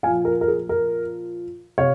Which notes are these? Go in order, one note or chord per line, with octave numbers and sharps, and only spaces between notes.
A#2 F3 F5 G#5
A#4
A#4
G#4
A#4
C3 C#5 F5